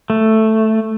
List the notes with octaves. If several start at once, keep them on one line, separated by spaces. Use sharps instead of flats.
A3